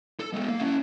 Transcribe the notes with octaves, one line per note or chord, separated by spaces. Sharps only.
A4
G#3 B3
A#3 F5
C#4 E4